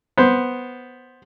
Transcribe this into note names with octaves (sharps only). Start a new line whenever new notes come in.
B3 C5